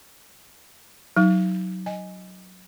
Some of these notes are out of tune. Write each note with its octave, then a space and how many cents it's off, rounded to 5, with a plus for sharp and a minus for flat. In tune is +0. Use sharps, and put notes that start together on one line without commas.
F#3 +0 D#4 +30
D#5 +0 G#5 +0